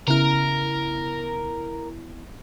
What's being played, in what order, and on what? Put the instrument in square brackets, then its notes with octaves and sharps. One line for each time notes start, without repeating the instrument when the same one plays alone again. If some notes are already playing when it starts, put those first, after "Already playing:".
[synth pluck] C#3 F6 [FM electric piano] B3 E4 [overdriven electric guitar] A#4